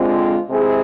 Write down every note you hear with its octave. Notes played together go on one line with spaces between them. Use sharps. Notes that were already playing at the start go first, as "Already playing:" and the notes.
Already playing: D3 G#3 C4 F4
C3 G#3 C4 E4 G#4